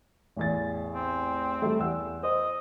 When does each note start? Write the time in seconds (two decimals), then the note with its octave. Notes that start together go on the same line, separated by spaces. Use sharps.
0.37 A1 E2 A6
0.95 C4
1.62 G3 A3
1.79 E2 F#5 E6
2.23 C5 D#5